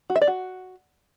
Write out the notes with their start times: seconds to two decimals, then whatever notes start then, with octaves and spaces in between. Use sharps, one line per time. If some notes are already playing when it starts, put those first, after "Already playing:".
0.10 F#4
0.16 E5
0.22 D5
0.27 F#4